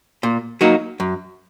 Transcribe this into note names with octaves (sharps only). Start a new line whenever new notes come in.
A#2
F#3 A#3 D#4 F#4
F#2